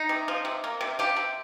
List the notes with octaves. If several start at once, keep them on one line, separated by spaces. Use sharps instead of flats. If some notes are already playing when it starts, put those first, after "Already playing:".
Already playing: D#4
C3
F3
C3
A#3
C3
F3 G4
C3